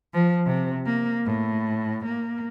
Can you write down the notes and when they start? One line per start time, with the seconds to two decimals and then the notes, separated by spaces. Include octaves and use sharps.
0.13 F3
0.46 C3
0.85 A#3
1.25 A2
2.05 A#3